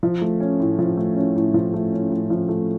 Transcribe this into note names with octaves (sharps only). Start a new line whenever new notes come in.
F3
A3
C#4
A2
F3
A3
C#4
A2
F3
A3
C#4
A2
F3
A3